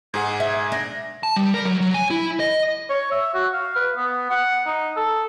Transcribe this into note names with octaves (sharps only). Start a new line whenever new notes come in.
G#2 G#4 F#5 G#6
E5
D4 A#6
A5
G3
A#4
F#3
F#3
G#5
E4
D#5
C#5
E5
F#4
F5
B4
B3
F#5
D#4
A4